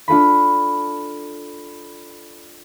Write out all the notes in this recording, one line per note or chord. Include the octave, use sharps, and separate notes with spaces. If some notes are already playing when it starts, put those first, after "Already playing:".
D4 F4 A4 B5